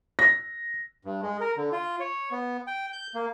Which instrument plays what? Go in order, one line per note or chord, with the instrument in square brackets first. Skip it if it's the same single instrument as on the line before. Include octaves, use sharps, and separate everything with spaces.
[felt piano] A#6
[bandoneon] G2
G#3
A#4
D3
F4
C#5
B3
G5
G6
A#3